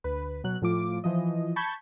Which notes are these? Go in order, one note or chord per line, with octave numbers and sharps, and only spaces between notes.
D2 B4
B2 F#3 F#6
A2 F3 F4 D6
E3 F3 D#5
A5 B5 C#6 G6 G#6